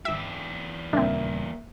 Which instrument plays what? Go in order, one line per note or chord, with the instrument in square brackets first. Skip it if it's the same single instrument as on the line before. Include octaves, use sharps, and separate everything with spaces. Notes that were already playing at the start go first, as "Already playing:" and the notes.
[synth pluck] G#1 E5 [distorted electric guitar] E2 G4
[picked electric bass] D#1 C#2 G3 [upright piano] A#3 E5 [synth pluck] C4 D4